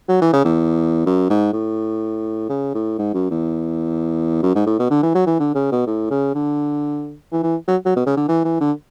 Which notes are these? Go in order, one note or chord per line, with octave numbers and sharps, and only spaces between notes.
F#3
E3
C#3
E2
F#2
G#2
A2
C#3
A2
G#2
F#2
E2
F#2
G#2
A2
B2
D3
E3
F#3
E3
D3
C#3
B2
A2
C#3
D3
E3
E3
F#3
F#3
B2
C#3
D3
E3
E3
D3